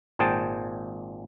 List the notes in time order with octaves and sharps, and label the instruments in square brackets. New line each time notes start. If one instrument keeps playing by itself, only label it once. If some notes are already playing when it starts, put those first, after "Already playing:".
[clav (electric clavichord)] G#1 A#2 G#4 C5 G5 A5